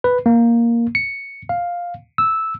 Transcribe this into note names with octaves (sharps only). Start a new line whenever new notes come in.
B4
A#3
C#7
F5
E6